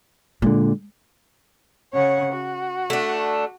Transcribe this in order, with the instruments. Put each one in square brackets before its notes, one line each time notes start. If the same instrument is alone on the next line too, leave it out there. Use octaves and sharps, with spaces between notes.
[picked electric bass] A#2 D3 [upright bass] G#3
[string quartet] C#3 C#5 F#5
F#4
[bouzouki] A3 D4